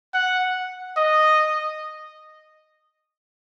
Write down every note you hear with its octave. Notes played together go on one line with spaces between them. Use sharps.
F#5
D#5